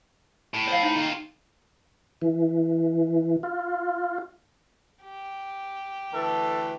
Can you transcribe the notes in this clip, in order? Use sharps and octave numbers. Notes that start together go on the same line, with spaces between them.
A2
C5 F5
D#4
D#2 F4
E3
F4
G4
D2 E3 A4